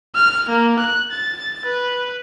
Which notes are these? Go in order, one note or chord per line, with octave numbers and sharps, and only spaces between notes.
F6
A#3
F#6
A6
B4